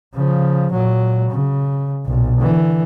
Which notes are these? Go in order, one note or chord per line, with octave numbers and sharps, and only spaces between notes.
C#3 F3
A#2 F#3
C#3
B1 A#2
D3 E3